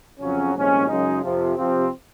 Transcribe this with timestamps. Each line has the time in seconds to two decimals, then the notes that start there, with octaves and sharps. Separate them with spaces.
0.20 F2 C#3 F#3 C#4
0.54 C2 A#2 F3 G#3 C#4
0.88 F#2 C#3 G#3 D#4
1.22 F2 C3 F3
1.56 C3 F3 C4